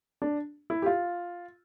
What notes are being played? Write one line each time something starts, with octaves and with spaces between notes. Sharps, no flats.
D4
E4
G4
F4